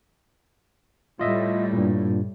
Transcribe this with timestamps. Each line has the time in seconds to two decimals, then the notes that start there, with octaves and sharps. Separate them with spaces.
1.19 A2 G3 F4 D#5 E5
1.73 G2 A#2